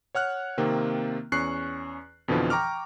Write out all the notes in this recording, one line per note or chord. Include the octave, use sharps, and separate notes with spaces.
C#5 F#5 F6 F#6
C3 D#3 A#3 C4
E2 C#4 C#6 F#6 C7
F2 B2 D3 E3 F3
G5 A#5 C#6 D6 F6